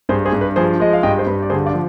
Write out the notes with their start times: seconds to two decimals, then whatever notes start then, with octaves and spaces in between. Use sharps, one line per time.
0.09 G2 G#4 C5
0.25 G#4 C5
0.33 G2
0.41 B4
0.56 F3 G#4 C5
0.80 G#3 D#5
0.93 F5
1.03 G2 D#5 G5
1.19 C5
1.27 G2 B4
1.42 D5
1.50 D3 G#4 C5
1.66 D5 F5
1.73 F3